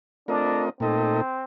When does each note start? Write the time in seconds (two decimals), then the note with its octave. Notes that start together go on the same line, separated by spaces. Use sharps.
0.28 A3 C4 D4 F4 A#4 D#5
0.80 A#2 A3 C4 D#4 A4 D#5